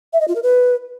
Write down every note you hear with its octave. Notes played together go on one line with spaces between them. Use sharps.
E5
D#5
F4
A#4
B4